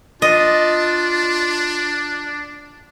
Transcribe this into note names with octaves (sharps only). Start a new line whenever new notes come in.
D4 F4 D#5